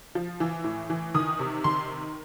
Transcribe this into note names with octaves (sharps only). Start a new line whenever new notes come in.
F3
E3
A2
E3
D#3 D#6
C3
D#3 C6